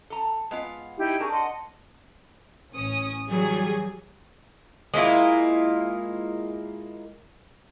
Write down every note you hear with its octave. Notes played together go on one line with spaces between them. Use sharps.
A4 A#5
G#3 B3 F4
D#4 E4 G4
D4 G#4 A#4 C#6
D#5 F#5 C6
A1 C#4 D#6
E3 F#3 G3 G#4
G#3 A#3 E4 F4